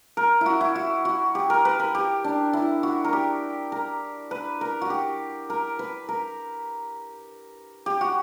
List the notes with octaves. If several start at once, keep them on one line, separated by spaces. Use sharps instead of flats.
A#4
E4 F#4
E4
F#4
F#4
G4
A#4
B4
A#4
G4
D4
E4
F#4
A#4
G4
A#4
B4
A#4
F#4
G4
A#4
B4
A#4
G4
F#4